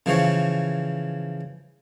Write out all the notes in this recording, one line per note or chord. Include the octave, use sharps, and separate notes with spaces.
C#3 E3 F3 C#5